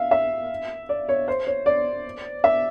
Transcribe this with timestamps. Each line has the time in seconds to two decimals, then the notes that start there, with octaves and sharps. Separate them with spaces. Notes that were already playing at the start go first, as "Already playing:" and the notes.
Already playing: E5 F5
0.11 E5
0.89 D5
1.09 C#5
1.28 C5
1.47 C#5
1.66 D5
2.44 E5